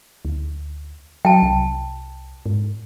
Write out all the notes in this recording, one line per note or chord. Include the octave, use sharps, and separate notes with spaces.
D2
F#3 G5 A5
C2
G#2